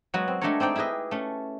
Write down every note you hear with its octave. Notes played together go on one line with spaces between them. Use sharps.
F#3 G#3 B3 F#4
C4
G#3 A3 D4 A4 A#4 C#5
C4 D#4 D5 G5
E4 G4 G#4 B4 D#5
A3 C#4